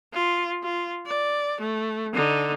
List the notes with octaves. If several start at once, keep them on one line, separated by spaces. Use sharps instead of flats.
F4
F4
D5
A3
D3 D#4